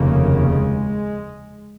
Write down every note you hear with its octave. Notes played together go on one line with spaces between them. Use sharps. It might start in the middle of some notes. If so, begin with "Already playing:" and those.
Already playing: F1 D#2 C#3 A#3
G#3